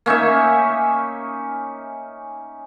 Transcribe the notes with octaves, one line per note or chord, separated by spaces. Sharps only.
A#3 C#4 D#4 E5